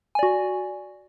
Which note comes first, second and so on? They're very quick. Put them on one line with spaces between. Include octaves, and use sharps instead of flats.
G#5 D5 F#4